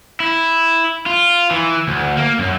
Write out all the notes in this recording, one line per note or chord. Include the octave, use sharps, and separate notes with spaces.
E4
F4
E3
D2
A#3
F#2